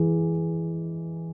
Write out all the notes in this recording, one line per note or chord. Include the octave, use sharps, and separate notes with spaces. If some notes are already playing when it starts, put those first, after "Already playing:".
Already playing: E3 G#3